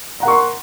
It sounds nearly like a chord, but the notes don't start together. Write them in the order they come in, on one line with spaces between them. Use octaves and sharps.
A#5 F#5 A#4 C#6 C6